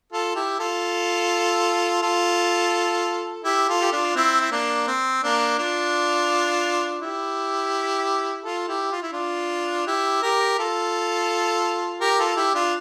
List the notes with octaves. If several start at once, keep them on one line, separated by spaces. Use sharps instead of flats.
F4 A4
E4 G4
F4 A4
F4 A4
E4 G4
F4 A4
G4
D4 F4
C4 E4
E4
A#3 D4
C4
A#3 D4
D4 F4
E4 G4
F4 A4
E4 G4
F4
E4
D4 F4
E4 G4
G4 A#4
F4 A4
G4 A#4
F4 A4
E4 G4
D4 F4